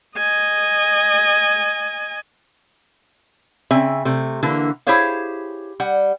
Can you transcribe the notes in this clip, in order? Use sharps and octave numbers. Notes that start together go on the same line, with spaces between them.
D#5 G#5
C#3 C4 E5 G#5
C3 A3
D3 E3 A#3
E4 G4 G#4 C5 C#5 F5
G3 F#5